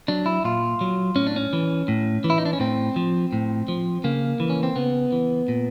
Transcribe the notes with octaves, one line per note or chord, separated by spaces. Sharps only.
F#3 D4
E4
A#2 F4
F#3
A2 C#4
D4
C#4
E3
A2
E3
E4
D#4
D4
C#4
A2 C4
F3
A2
F3
C#3 A#3
E3
C#4
C4
C#3 B3
E3
A#2